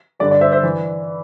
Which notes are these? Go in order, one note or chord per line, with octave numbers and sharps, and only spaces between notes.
G2 D3 G3 D5
D5
C5 E5
C5 E5
E3